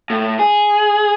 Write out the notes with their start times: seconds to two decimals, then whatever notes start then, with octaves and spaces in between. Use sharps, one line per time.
0.10 A2
0.39 G#4